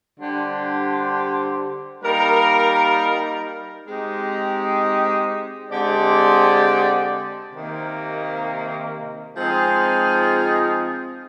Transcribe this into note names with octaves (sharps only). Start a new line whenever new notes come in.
D3 G3 D4 G4 C5
G3 A#3 D#4 A#4
G#3 C4 D#4 G4
D3 G#3 C4 G4 D5
C3 D#3 A#3
F3 G#3 C4 D#4 G#4